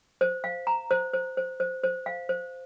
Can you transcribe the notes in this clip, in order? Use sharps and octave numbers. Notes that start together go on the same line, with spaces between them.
C5
F5
A#5
C5
C5
C5
C5
C5
F5
C5